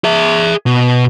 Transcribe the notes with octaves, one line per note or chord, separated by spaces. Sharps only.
G#4 E5
B2